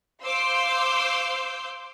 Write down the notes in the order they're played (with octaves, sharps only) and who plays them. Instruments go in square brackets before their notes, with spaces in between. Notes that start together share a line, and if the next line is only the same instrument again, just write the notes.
[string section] C5 F5 C6 D6 E6 G6